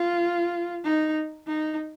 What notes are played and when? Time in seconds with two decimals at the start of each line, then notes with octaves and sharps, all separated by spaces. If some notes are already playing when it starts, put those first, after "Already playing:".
Already playing: F4
0.84 D#4
1.47 D#4